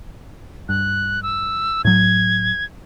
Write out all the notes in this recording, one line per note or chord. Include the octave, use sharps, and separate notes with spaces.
G2 F#6
E6
A2 F#3 G#6